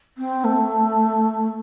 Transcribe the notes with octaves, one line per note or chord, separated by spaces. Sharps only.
C4
A3